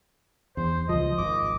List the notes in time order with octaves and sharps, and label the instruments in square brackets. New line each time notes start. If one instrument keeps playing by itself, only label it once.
[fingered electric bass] E2 [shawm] C5
[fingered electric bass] C#2 F3 [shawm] D#5
[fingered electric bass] G#1 [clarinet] D6